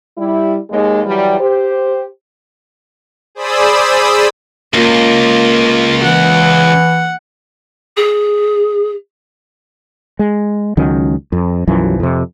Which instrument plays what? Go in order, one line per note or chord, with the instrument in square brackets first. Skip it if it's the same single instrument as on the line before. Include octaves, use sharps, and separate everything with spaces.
[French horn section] G3 E4
D#2 G#3
E3 F#3 G3
G4 C5
[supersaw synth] G#4 C5 D5 B5 D#6 E6
[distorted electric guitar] C#2 [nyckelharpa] A#3 F4
[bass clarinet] E3 [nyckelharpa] F#5
[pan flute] G#4
[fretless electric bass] G#3
C#2 D#3 F#3 C#4
F2
B1 F#2 E3 F3
F2 C3